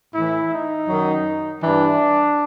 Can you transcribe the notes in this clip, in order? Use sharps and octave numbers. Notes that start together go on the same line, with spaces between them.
A2 E3 E4
D#4
F#2 D#3 F#3
G2 E3 D4